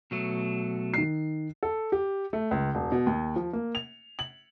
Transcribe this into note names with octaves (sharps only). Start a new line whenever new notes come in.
B2 F#3 A3
D#3 C7
A4
G4
A3
C#2
E1
B2
D#2
F3
A#3
F7
F#7